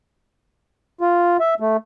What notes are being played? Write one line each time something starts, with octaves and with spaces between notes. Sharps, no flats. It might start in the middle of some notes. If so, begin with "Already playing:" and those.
F4
E5
A3